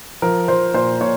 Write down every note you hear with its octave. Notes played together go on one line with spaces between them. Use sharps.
F3 A#4
F3 C5
A#2 C5
A#2 C#5